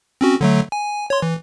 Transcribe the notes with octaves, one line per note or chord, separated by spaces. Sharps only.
C4 C#4 F#4
D3 F#3 A3
G#5
C#5 C6
E3